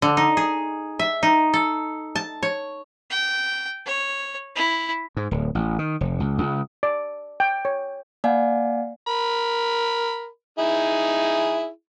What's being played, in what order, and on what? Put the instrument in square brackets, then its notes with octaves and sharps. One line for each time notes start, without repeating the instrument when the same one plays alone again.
[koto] D3
D#4
G#4
E5
D#4
A4
A5
C#5
[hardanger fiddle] G5
C#5
E4
[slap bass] G#2
D1
A1
D#3
F1
C#2
C#2
[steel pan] D5
G5
C#5
[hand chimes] A#3 D5 F5 F#5 G#5
[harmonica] A#4 B5
D#4 E4 G#4